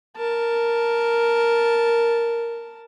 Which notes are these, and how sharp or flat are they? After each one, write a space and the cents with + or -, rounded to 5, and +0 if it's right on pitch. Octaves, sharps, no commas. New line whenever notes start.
A#4 +0 A5 +0